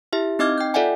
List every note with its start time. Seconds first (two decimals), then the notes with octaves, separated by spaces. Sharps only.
0.13 E4 G4 E5
0.39 C4 D#4 D#5 D6 F6 G#6
0.58 G5 G6
0.74 F4 A4 D5 E5 F#5 G#5